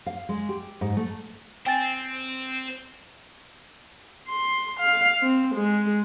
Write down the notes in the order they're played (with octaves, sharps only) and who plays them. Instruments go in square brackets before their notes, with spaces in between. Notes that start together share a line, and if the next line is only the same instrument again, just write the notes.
[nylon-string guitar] F5
G#3
G4
G#2
A3
[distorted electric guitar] C4 [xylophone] G5 G#5 A6
[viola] C6
F5
C4
G#3